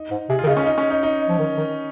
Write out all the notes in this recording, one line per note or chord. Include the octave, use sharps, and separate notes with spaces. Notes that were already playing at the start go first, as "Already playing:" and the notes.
Already playing: D#4
G#2
C3 G#4
F4
D#3
C#3 D#4
C#4
D#4
C#4
D#4
D#4
F3
D#3
D#3